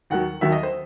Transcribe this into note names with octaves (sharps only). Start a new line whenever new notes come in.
D#2 D#3 F#3 F#5
D#2 D#3 F#3 E5
D#5
C5